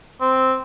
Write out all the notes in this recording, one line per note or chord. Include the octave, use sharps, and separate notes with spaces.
C4